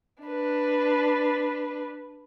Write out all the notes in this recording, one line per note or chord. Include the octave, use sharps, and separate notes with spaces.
D4 B4